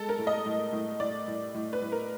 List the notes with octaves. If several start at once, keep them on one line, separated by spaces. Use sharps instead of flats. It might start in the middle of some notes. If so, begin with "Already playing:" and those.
Already playing: G#3 A4
A#4
A2
D#5
A2
A2
A2 D5
A2
A2
B4
A2
A#4